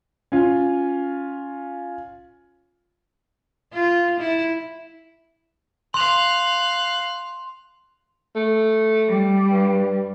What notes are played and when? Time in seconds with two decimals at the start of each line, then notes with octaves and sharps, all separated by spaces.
0.32 C#4 F4
3.73 F4
4.19 E4
5.94 F5 C6 F#6 F7
8.36 A3
9.07 G3
9.51 G2